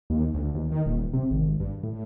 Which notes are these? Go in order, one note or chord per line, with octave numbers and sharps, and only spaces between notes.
D#2
D2
D#2
D#3
D#1
C3
G#1
G2
A2